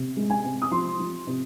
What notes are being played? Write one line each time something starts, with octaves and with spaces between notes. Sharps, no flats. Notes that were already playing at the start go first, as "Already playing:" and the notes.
Already playing: C3
G#3
G#5
C3
D#6
F3 C6
F3
C3